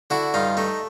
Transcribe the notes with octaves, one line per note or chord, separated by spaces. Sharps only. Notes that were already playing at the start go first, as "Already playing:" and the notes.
D3 E4 F#4
G2 D#4 F4
A3 D#4